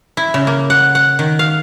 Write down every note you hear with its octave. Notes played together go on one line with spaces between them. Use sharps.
E4
C#3
A#3
F#5
F#5
D#3
F5